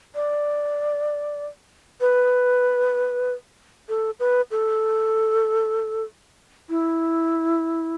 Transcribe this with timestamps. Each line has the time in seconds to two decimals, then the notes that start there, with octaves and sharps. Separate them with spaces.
0.15 D5
2.01 B4
3.89 A4
4.20 B4
4.51 A4
6.69 E4